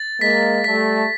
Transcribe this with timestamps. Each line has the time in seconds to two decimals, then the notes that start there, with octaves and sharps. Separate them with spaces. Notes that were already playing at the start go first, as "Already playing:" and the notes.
Already playing: A6
0.21 G#3 A#3 B6
0.64 G3 A3 B6